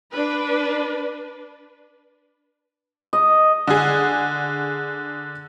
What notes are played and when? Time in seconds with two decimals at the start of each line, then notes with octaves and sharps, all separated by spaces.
0.12 D4 B4
3.13 D#5
3.67 D3 G#4